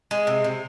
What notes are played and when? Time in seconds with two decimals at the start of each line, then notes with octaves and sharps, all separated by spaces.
0.11 G#3
0.27 C3
0.44 C3